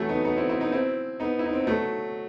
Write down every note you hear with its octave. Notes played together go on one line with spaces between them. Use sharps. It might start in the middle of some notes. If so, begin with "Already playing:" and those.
Already playing: E3 F#3 A3
B3 D#4
B3 D#4
C4 E4
C4 E4
B3 D#4
C4 E4
B3 D#4
E4
D#4
C4
B3
F#3 A3